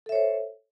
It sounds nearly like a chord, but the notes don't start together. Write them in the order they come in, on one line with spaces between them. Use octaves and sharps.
A4 E5 C#5 C5